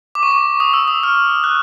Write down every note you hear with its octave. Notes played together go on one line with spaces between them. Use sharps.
D6
C#6
D6
D#6
E6
D#6
F6
F#6